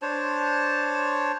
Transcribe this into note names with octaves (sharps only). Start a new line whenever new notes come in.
D4 C5 C#5 A5